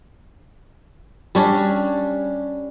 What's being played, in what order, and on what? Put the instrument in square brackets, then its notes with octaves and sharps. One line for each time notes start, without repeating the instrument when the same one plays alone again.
[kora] G3 C#4 D4